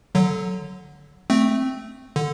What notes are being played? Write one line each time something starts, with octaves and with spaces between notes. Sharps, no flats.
D3 F#3
A3 C4
D3